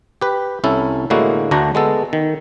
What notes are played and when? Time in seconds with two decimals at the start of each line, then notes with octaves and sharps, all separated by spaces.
0.21 G4 B4
0.64 C2 C#4 E4 A4
1.10 A2 D3 G#3 A#3 E4 F#4
1.51 D2 D3 A3 D4 F#4 A#5
1.75 G#3 B3 A4
2.13 D#3